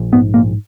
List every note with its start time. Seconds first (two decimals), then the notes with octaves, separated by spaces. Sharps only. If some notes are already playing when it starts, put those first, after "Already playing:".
Already playing: A#1
0.13 G#2 B3
0.34 A#1 A#3